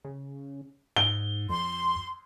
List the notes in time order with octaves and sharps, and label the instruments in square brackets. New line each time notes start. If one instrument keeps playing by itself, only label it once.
[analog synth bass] C#3
[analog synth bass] G#2 [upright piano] G7
[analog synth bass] F2 [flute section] C6